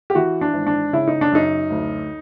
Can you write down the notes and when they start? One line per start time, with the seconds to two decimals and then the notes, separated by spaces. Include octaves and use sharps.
0.10 G4
0.15 E3 F#4
0.41 D4
0.54 G#1
0.67 D4
0.93 C#3 E4
1.08 D#4
1.21 D4
1.32 F#2 D#4
1.70 D2